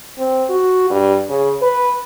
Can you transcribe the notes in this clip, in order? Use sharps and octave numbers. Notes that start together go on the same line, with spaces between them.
C4
F#4
G2
C#3
B4